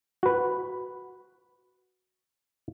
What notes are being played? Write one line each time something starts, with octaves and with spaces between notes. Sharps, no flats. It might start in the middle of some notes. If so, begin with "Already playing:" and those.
F#4 B4